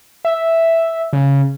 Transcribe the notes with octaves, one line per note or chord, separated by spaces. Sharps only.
E5
C#3